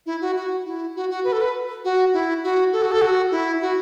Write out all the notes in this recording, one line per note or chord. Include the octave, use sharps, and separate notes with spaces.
E4
F#4
F#4
E4
F#4
F#4
B4
A4
B4
F#4
E4
F#4
A4
F#4
A4
F#4
E4
F#4